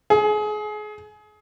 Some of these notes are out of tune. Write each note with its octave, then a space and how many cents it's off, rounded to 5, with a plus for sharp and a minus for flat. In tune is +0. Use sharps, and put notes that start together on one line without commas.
G#4 +30